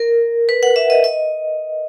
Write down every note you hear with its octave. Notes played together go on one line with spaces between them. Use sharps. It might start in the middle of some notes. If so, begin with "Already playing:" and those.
Already playing: A#4
B4
F#5
E5
D#5
D#5